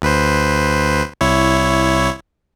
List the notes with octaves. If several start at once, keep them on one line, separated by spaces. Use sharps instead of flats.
D2 B4 C5
C2 E4 C#5